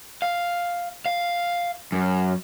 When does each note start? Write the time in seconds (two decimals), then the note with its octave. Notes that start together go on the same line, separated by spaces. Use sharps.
0.22 F5
1.06 F5
1.92 F#2